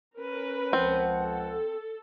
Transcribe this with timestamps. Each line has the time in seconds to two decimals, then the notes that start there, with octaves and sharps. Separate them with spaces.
0.18 C#4 A#4 B4
0.73 C#2 F3 C4 F#5
1.23 A4